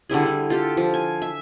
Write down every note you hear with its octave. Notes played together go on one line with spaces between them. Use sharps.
D3 G3 E4 G#4
D3
F4 G4 A4
F3
G#5
E5